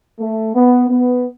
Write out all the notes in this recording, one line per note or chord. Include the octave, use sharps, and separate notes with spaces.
A3
B3
B3